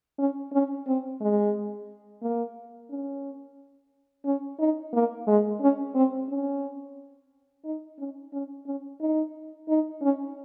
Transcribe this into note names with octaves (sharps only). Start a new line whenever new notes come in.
C#4
C#4
C4
G#3
A#3
C#4
C#4
D#4
A#3
G#3
C#4
C4
C#4
D#4
C#4
C#4
C#4
D#4
D#4
C#4